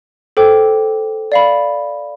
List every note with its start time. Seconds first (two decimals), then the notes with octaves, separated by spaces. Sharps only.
0.37 A4 C5 G5 D6
1.32 D5 F5 B5